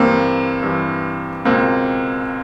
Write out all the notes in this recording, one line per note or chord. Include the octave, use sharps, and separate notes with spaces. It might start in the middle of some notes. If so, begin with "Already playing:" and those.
Already playing: G2 E3 A#3 C4
G2 E3
C#2 B2 A#3 C4